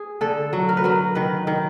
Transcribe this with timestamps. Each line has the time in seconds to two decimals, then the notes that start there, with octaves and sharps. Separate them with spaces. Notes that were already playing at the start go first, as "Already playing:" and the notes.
Already playing: G#4
0.21 D3 A4
0.53 F#3
0.69 A#4
0.77 B4
0.84 F#3 A#4
1.15 D#3 B4
1.47 D#3